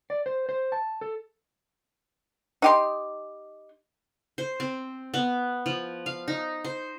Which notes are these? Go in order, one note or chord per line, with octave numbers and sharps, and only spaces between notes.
D5
C5
C5
A5
A4
D#4 G4 C6
C5
C4
B3
F3
F5
D#4
C5